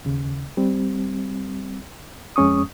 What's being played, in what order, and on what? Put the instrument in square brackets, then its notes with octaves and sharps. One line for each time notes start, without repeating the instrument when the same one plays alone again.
[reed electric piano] D#2 C#3
G3 C4
F2 G#3 C#4 C#6 D#6